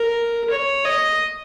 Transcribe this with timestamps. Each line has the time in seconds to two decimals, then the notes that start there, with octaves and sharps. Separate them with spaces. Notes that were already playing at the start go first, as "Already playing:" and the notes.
Already playing: A#4
0.50 C#5
0.85 D#5